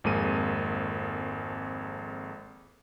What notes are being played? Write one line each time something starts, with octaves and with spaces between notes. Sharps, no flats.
G#1 F2 G#3 A#3 D#7